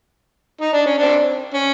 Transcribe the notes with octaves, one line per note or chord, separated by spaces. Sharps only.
D#4
D4
C#4
C4 D4
C#4